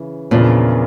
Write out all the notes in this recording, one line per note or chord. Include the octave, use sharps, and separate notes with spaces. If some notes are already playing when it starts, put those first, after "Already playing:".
Already playing: C#3 E3
E2 A#2 C#3 F3 A#3 D4